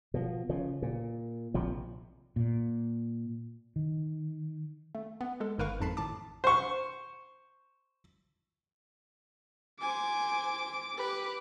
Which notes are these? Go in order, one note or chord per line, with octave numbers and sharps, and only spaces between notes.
B2 F3
C#3 F3
A#2
A#1 C3 F3
A#2
D#3
A3
B3
G#3 A4
G1 G#2 A#4 B4 F5 C#6
F2 G#2 A5 B5 C7
G#1 A2 A5 D6
C5 C#6
C5 G#5 D6
G4 B4